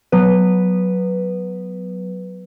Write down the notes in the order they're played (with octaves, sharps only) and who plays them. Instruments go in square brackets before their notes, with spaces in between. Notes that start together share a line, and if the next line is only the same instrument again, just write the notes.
[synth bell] F#3 B3 B4